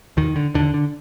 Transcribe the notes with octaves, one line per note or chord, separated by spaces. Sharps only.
D#2 D#3
D3
D#2 D3
D3